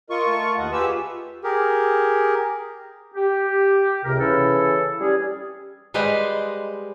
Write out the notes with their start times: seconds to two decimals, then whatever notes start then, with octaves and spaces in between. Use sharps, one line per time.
0.10 F4 A#4 D#5 C#6
0.27 A3 A5
0.57 D#2 D#5 F#5
0.72 F4 G4 G#4 B4 E6
1.44 G4 G#4 A#4
3.15 G4
4.04 C#2 C3 A#4
4.18 C#3 E3 C#4 E4 A4
5.00 G3 C#4 G#4
5.94 G3 G#3 B4 C5 D#5 F5